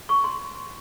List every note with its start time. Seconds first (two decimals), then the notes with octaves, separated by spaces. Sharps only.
0.09 C#6
0.24 C6